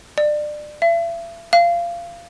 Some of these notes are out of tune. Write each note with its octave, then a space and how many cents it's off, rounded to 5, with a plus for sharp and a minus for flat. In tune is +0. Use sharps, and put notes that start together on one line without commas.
D5 +25
E5 +40
F5 -20